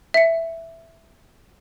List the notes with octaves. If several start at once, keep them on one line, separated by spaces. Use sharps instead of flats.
E5 C#7